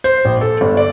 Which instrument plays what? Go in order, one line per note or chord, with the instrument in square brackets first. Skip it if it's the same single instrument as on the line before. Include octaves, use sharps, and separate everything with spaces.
[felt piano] C5
A#1
A4
G1
D5